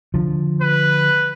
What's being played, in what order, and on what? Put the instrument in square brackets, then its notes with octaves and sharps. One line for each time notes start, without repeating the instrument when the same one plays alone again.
[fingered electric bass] D3 F3
[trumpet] B4